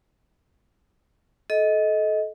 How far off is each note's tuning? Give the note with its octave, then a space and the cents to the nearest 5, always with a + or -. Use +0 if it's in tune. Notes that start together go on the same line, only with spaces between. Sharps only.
A4 -25 D#5 +15